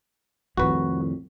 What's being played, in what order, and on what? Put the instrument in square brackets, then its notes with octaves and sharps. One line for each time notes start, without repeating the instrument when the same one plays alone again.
[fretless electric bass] C2 F2 A2 [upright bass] D#3 F3 [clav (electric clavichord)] F#4 B4